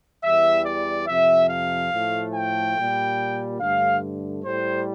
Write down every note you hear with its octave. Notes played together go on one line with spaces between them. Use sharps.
E2 E3 G3 E5
D5
F2 C3 F3 E5
F5
A2 F3 A3
G5
A#2 G3
G2 D3 A3 F5
A2 G3 C5